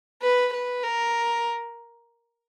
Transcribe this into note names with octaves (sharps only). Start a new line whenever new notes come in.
B4
B4
A#4